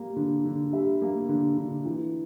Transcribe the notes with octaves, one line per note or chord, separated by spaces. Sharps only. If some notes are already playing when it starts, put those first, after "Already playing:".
Already playing: G3 A#3
D3
D3
G3 E5
A#3
D3
D3
E3